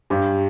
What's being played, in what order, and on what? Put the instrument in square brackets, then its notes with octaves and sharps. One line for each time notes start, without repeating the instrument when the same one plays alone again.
[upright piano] G2 G4